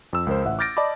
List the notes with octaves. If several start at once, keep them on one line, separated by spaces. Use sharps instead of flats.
F2 E6
C#2 A#4 C5
A1 E5 F#5
D6 F6 G6 A6 A#6 D7
D5 D#5 A5 B5 D6